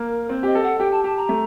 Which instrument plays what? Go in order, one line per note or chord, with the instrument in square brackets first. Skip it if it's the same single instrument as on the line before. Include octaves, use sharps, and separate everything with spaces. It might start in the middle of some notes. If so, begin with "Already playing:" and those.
Already playing: [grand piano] A#3 [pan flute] A#4
[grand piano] C4 [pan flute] C5
[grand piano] G4 [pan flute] D#5
[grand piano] A4
[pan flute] F#5
[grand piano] G4 [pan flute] G5
[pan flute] A5
[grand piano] G4 [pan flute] A5
[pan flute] A#5
[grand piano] A3